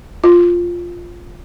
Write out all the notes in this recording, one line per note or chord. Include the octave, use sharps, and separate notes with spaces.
F4